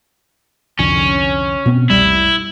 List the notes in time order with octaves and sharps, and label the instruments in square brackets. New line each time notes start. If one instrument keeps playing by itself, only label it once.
[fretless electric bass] C2 F2 D3 [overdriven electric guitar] C#4
[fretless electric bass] B2 B3 C4
[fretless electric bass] F1 C2 G3 [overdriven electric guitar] E4